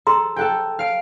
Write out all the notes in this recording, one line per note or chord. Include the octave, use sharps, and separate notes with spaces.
A4 A#5 C6
A4 F#5 G5
F5 D7